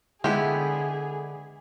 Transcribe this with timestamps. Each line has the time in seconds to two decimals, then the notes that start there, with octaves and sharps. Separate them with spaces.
0.24 D3 G#3 B3 E4 G4 G#4